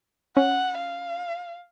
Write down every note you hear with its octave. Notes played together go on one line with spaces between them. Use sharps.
C#4 F#5
F5